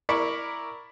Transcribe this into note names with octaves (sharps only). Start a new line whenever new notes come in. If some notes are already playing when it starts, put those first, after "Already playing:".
E4 A#4 D5 B5 C#6